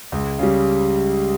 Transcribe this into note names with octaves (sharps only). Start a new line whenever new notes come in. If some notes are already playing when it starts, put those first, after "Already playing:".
C#2
C#3 G3